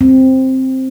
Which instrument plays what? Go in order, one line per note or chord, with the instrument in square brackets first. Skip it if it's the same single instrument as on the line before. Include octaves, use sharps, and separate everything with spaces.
[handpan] C4